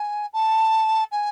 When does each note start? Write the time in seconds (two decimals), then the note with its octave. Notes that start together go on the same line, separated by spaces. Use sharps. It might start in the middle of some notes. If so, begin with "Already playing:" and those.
Already playing: G#5
0.33 A5
1.12 G#5